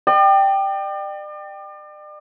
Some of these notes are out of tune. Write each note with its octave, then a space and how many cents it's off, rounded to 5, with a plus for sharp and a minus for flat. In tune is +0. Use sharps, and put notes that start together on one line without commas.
D5 +40 G5 +0